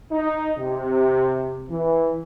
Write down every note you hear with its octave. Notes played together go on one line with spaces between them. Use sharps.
D#4
C3
E3